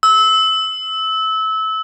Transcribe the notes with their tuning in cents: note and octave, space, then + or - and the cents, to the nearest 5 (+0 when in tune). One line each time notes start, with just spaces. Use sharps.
E6 -25